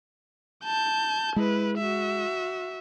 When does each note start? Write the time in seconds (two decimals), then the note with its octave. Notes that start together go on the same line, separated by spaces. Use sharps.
0.65 A5 G6
1.36 G#3 E4 B4
1.78 F#4 E5